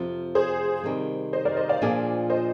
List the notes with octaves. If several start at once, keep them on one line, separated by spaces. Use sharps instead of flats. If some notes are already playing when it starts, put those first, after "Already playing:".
Already playing: F2 C3 F3
G#4 C5
C3 D#3 G3
C5 D#5
A#4 D5
C5 D#5
D5 F5
A#2 F3 A#3 D4 G#4
C5 D#5